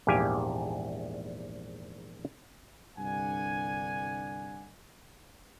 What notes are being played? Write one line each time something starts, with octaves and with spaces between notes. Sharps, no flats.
A#1 E2 G#2 G4 F5 G#5
C2 G2 D3 D5 F#5 G#5